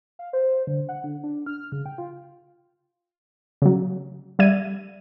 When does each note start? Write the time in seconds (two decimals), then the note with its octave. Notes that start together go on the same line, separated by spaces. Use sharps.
0.19 F5
0.33 C5
0.67 D3
0.89 F#5
1.04 D3
1.24 D4
1.46 F6
1.72 C#3
1.86 G5
1.98 F4
3.62 C#3 F#3
4.39 G3 D5 E5 G#6 D#7